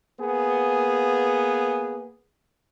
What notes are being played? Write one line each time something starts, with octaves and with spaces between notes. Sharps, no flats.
A#3 B3 G#4